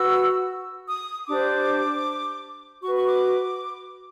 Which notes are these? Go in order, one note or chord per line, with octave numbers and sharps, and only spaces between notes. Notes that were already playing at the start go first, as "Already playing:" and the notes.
Already playing: F#4 B4 E6
D#6
D4 G4 C5 D6
F#4 B4 C#6
C#6
D6